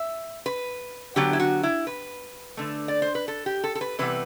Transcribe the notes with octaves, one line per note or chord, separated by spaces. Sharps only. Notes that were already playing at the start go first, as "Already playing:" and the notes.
Already playing: E5
B4
D3 F#3 B3 G4
E4
F#4
E4
B4
D3 A3
D5
C5
B4
A4
G4
A4
A4
B4
C3 E3 G3 B3 B4